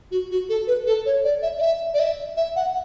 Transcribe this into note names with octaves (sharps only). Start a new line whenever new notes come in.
F#4
F#4
A4
B4
A4
C#5
D5
E5
D5
E5
D5
E5
E5
F#5